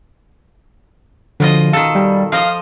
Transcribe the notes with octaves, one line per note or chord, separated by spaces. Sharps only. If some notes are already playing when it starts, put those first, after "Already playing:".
B2 D3 F3 F4 D#5
D#3 A4 F5
G3
F3 D#5 F5